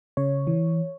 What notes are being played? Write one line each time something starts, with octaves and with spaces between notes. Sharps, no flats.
C#3 C#5
E3